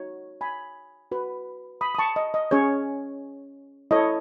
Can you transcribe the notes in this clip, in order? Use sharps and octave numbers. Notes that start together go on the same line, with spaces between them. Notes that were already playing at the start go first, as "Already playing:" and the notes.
Already playing: D#4 F#4 C#5
G#5 B5
F#4 B4
B5 D#6
D#6
A5 C#6
D#5
D#5
C#4 G#4 C#5
E4 A4 C#5 D#5